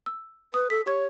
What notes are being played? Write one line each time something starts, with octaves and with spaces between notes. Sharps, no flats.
E6
B4 D#6
A4 B6
G4 C#5 C#6 G#6